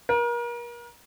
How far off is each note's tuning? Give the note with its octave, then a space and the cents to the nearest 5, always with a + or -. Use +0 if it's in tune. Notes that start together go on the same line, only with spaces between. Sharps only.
A#4 +35